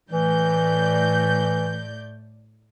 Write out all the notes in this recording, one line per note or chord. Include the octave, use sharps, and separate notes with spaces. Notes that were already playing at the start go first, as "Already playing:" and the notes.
A2 E3 D5 G6